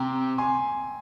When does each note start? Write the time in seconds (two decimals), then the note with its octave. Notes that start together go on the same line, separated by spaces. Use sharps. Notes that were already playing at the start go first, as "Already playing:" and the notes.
Already playing: C3 G5 A#5
0.38 G#5 C6